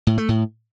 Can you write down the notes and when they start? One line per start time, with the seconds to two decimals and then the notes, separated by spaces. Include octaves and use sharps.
0.07 A2
0.18 A3
0.29 A2